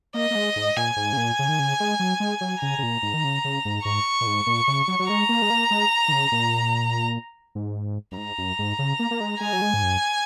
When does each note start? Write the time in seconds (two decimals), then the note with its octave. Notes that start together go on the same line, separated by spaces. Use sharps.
0.14 A#3 D#5
0.31 A#3
0.35 G#3
0.56 G#2
0.77 A#2 G#5
0.97 G#2
1.13 C#3
1.17 A#2
1.39 C#3
1.49 D#3
1.59 C#3
1.80 G#3
1.99 F#3
2.20 G#3
2.41 F#3
2.62 C#3 A#5
2.78 C#3
2.83 A#2
3.03 G#2
3.14 D#3
3.24 C#3
3.45 C#3
3.65 G#2
3.85 G#2 C#6
4.21 A#2
4.27 G#2
4.47 A#2
4.68 C#3
4.88 F#3
4.99 F#3
5.09 G#3 A#5
5.29 A#3
5.42 G#3
5.50 A#3
5.71 G#3
6.08 D#3
6.12 C#3
6.32 A#2
7.55 G#2
8.12 F#2
8.18 G#2 A#5
8.38 F#2
8.59 G#2
8.79 C#3
8.99 A#3
9.11 A#3
9.21 G#3
9.40 G#3 G#5
9.53 F#3
9.62 G#3
9.74 G#2
9.83 F#2